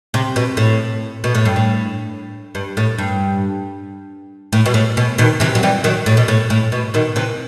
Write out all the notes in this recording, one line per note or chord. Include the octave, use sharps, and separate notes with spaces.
C3
B2
A2
B2
A2
G2
A2
G2
A2
G2
A2
B2
A2
B2
B2 D#3
C3 E3
F#3
E3 G3
D#3 F#3
A2
B2
A2
A2
B2
B2 D#3
C3 E3